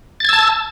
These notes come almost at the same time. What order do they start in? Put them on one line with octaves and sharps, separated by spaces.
A6 G#6 E6 A5